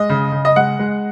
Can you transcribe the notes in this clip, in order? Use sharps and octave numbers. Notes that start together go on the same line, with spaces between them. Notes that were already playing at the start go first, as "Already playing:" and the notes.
Already playing: G#3 D#5
C#3
C#3
D#5
G#3 F#5
G#3